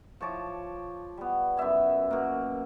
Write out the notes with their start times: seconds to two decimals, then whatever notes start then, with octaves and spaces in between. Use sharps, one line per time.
0.20 F3 C#5 A5 D6
1.17 G3 B3
1.57 F#2 B3 E5 G#5
2.11 B2 A#3